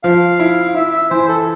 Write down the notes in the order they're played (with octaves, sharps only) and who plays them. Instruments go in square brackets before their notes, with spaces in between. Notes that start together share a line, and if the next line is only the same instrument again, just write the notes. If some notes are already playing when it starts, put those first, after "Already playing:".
[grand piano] F3 [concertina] F5
[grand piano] E4
[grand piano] E4 [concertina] E5
[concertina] E5
[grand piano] E3 [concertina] C5
[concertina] A4